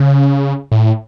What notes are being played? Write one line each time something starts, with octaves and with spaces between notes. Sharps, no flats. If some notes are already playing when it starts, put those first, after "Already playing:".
Already playing: C#3
A2